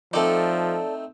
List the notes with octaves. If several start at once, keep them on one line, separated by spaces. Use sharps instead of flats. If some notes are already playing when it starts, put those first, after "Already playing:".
F3 A3 C4 D#4 A4 D5